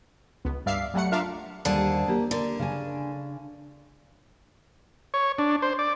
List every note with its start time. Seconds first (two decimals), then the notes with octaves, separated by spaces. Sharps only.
0.45 C#2 B3
0.66 G2 D5 E5 F5 C7
0.94 F#3 G3 A3 F#5 C#7
1.12 D4 F4 A#4 E5 F5
1.65 D#2 D3 G3 G#4 C5 A5
2.07 A#3 G4
2.31 D3 A#4
2.59 C#3 D4 G#5
5.14 C#5
5.39 D4
5.62 C5
5.79 D5